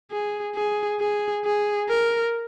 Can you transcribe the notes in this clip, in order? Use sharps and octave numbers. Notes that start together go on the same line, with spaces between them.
G#4
G#4
G#4
G#4
A#4